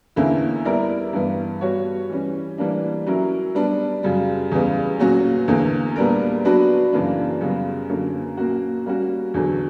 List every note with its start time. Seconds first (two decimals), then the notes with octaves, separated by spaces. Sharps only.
0.16 E2 D3 A#3 C#4 E4
0.65 G3 B3 E4 A#4 D5
1.13 G2 E3 B3
1.61 G3 B3 F#4 C#5
2.10 E3 G3 C#4
2.58 E3 G3 A#3 D4
3.07 F#3 C#4 E4 A#4
3.55 G3 B3 D4
4.03 F#2 C#3 G3
4.52 E2 C#3 G3 B3
5.00 A#2 F#3 C#4 F#4
5.48 E2 D3 A#3
5.96 A#2 G3 B3 D4 A#4
6.45 F#3 B3 D4 F#4 B4
6.92 F#2 C#3 E3 A#3 D4
7.41 F#2 C#3 G3 B3 F#4
7.89 F#2 D3 A#3 C#4
8.37 A#2 A#3 C#4 F#4
8.86 G3 A#3 C#4 F#4
9.34 E2 D3 F#3